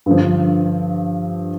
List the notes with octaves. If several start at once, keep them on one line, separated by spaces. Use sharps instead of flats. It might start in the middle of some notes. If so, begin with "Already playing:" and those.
G2 D3 F3